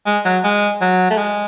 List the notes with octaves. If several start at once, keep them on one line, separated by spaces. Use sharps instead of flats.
G#3
F#3
G#3
F#3
A3
G#3